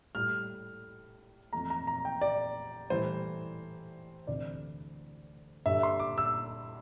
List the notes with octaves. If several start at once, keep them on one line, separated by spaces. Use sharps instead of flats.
A2 G3 F6
F2 E3 A3 A#5
A#5
A#5
G5
D5
A2 E3 G3 C5
D2 C3 E3 A3 D5
G2 D3 G3 E5
C6
D6
E6